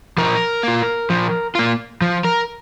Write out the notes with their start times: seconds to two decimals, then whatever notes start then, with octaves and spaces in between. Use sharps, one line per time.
0.18 F3 A#4
0.63 A#3 F4
1.10 F3
1.55 A#3 F4
2.02 F3
2.24 A#4